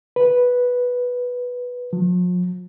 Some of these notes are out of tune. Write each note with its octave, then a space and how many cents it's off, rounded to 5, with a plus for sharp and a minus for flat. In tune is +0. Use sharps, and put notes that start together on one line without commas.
B4 -5
F3 +45